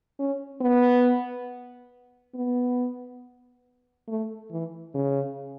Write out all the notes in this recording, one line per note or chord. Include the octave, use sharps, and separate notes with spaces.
C#4
B3
B3
A3
E3
C#3